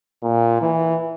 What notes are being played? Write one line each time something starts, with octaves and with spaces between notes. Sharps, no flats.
A#2
E3